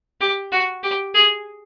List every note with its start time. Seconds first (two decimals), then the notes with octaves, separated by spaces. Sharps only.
0.21 G4
0.52 F#4
0.83 G4
1.15 G#4